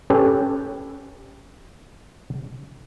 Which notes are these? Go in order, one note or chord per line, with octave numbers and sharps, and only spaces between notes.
C#4 G4 A4 B4 C#5